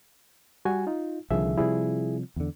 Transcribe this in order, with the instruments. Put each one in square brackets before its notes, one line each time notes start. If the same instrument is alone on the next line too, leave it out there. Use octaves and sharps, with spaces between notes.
[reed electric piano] G3 F#4 G#5
D#4 F4
[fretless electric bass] C2 D3 D#3 [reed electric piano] F3 G#4 E5
[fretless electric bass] C3 F3 G3 [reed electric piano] E4 G#4
[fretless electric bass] E2 D3